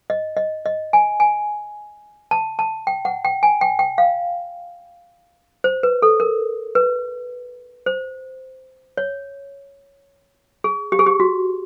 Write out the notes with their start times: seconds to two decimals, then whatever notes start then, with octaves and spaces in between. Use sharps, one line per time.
0.10 D#5
0.37 D#5
0.66 D#5
0.93 G#5
1.20 G#5
2.31 A5
2.59 A5
2.87 G5
3.05 F#5
3.25 G5
3.43 G#5
3.61 G5
3.79 G5
3.98 F5
5.64 C5
5.83 B4
6.02 A4
6.20 A#4
6.75 B4
7.86 C5
8.97 C#5
10.64 G#4
10.92 G4
10.99 G#4
11.06 G4
11.20 F#4